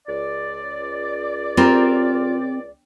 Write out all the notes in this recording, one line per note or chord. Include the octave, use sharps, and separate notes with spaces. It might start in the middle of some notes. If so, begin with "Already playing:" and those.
C#2 D5
C4 F4 G4 A#4